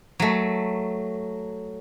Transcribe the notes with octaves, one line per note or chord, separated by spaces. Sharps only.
F#3 A3